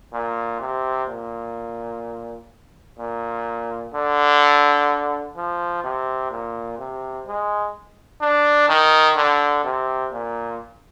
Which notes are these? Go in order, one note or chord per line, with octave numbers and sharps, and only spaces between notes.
A#2
C3
A#2
A#2
D3
F3
C3
A#2
C3
G#3
D4
D#3
D3
C3
A#2